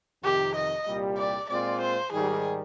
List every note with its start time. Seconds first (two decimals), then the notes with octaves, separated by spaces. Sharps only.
0.23 F2 C3 D#3 G4
0.55 D#5
0.86 C2 A#2 G3
1.17 D5
1.49 A#2 G#3 C4 F4 D5
1.81 C5
2.12 G#2 D#3 G3 G#4